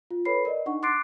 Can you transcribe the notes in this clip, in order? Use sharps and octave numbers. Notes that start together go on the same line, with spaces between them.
F4
A4 B4 C#5 B5 C7
A#4 D5 D#5
D4 D#4 F#5 C#6
C6 D6 F#6 A6 C7 D7